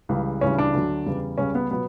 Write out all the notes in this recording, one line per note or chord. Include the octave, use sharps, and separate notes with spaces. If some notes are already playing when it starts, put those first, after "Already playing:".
C#2 C#3 E3 G3
D2 C#3 E3 G3 C#4
D4
D2 D3 F#3
E2 C#3 G3
C#2 C#3 G3 C#4
B3
B2 F#3 B3